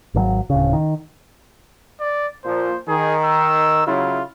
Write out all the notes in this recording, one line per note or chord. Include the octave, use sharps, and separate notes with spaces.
G#1 D3 F#3
D1 C#3
D#3
D5
A#2 F3 C5
D#3 G#4
E6
C#3 F#3 E4 F4